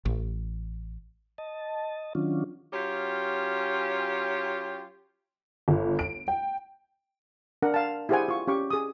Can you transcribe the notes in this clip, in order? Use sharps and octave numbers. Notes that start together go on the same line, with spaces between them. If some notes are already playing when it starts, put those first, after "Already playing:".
A1
D#5 A5
D#3 F#3 C#4 D4 F4
F#3 C#4 F4 G4
G1
D7
G5
D4 A#4 F#5
F5 A5
E4 G4 G#4 C5 F#5 G#5
F4 C#6
C#4 G4 C#6 D6
G#4 D#6